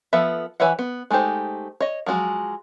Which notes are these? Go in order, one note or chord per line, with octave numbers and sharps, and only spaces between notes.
F3 B3 A4 B4 E5
E3 B4 C#5 E5 F#5
B3
G#3 A3 D#4 G4 C5
C#5 D#5
F3 F#3 G#3 F#4